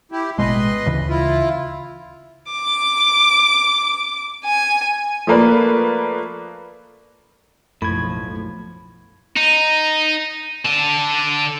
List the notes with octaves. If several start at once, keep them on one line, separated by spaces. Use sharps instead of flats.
E4 G4
A1 B2 G#3 B4 D#5 C6
D2 C#3 E3
E4 F4
D6
G#5
F3 A3 A#3 B4 D5
F#1 B1 F#2 A2 F3 B5 G#6
D#4
D3 A5